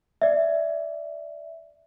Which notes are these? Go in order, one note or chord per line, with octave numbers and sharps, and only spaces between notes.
D5 E5